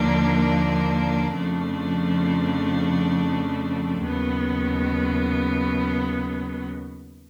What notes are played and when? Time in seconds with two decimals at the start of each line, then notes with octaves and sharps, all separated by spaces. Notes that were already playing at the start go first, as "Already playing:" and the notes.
Already playing: D#2 D3 F3 A#3 D4
1.35 F2 C#3 F3 A3 D4
4.02 D#2 C#3 F#3 B3